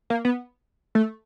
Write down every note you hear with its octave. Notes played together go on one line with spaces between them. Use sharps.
A#3
B3
A3